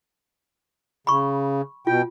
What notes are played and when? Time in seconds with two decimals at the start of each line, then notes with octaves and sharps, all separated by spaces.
1.07 C#3 B5 C#6
1.87 B2 F4 G5